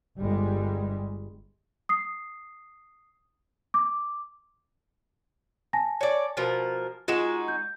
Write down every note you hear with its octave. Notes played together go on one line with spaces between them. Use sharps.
G1 G3 G#3
D#6 C7
D6
G#5 A5 A#6
C#5 D5
B2 F3 A#4
G#3 D#4 F4 F#4 E7
G6